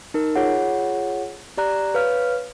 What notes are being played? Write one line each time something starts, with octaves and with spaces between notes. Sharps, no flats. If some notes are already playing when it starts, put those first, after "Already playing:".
D#4 A#4
F4 G#4 C#5 F#5
G4 D5 A#5 F#6
B4 C#5 F5 F6